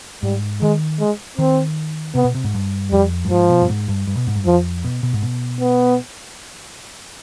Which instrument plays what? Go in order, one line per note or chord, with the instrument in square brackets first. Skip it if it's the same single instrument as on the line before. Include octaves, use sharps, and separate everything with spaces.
[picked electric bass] G#2 [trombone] G3
[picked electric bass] D#3 [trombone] G#3
[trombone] G#3
[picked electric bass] D#3 [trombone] C4
[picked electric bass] C3 [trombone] B3
[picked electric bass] B2
C3
G#2
G2
[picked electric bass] F2 [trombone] G3
[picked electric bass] G2
[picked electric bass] G#2 [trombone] F3
[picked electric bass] B2
G2
G#2
G2
G2
B2
G#2
G2
[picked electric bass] F2 [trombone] F3
[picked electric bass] B2
B2
G#2
B2
[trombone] B3